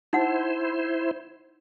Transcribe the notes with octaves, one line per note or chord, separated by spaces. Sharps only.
D#4 E4 C5 F#5